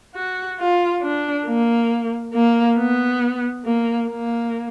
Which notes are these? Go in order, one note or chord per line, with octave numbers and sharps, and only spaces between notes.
F#4
F4
D4
A#3
A#3
B3
A#3
A#3